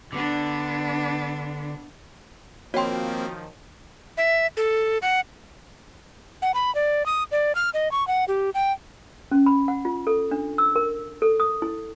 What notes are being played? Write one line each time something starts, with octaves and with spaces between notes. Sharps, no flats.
D3 B3 D4
D#3 F3 A#3 C4 F#4 C#5 G5 C6
E5
A4
F#5
F#5
B5
D5
D#6
D5
F6
D#5
C#6
F#5
G4
G5
C#4
B5
F#5
F4
A4
D4
E6
A#4
A4
D#6
E4